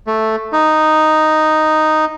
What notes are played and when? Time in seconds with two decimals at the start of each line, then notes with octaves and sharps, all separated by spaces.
0.07 A3
0.52 D#4